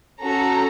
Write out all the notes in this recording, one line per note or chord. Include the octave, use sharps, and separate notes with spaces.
C#4 F#4 A4 A#5